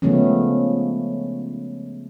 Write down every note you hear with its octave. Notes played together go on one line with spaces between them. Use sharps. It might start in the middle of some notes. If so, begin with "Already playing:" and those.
C#3 F3 G#3 A3 B3 C#4